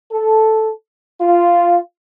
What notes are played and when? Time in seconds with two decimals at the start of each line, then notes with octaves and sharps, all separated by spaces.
0.11 A4
1.20 F4